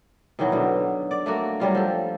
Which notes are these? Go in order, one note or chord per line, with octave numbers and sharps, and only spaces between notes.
B2 D#3 E3 F#3
B2 D3
D5
A3 A#3 F#4
F#3 G3 F4
F3 A4